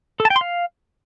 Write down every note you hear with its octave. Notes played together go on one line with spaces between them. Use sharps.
A4
A5
G5
C6
F5